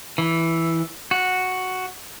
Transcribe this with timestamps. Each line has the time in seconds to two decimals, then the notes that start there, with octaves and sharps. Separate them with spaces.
0.18 E3
1.11 F#4